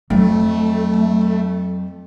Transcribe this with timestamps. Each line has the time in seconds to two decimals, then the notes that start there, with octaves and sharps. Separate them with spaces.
0.10 F2 F#3 A3